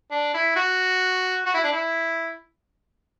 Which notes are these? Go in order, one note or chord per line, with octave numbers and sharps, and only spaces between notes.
D4
E4
F#4
F#4
E4
D4
E4